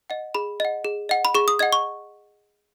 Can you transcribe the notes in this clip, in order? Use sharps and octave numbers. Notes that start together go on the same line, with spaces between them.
D#5 F#5
G#4 B5
D#5 F#5
G#4
D#5 F#5
B5
G#4 C#6
D#6
D#5 F#5 G#6
C#6